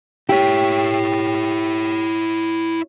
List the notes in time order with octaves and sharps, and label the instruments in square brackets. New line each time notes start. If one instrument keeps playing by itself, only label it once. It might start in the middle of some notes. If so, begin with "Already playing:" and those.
[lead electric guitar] E4 C#5 [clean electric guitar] G4